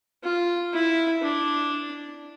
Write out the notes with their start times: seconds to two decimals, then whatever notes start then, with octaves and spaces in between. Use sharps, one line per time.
0.23 F4
0.73 E4
1.22 D4